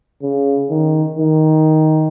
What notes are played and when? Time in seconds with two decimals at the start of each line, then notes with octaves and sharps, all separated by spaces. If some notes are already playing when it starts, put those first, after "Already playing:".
0.23 C#3
0.71 D#3
1.19 D#3